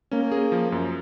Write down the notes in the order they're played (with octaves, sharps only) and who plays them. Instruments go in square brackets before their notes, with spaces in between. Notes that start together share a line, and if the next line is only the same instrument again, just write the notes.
[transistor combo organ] A#3 [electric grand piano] C#4
[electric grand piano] G#4
F3
F#2